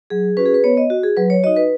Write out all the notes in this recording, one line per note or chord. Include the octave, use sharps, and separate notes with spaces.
F#3 G#4
C#4 F#4 B4
G#4
B4
B3 C#5
D#5
F#4
G#4
F#3 B4
C#5
D#4 F#4 D#5
B4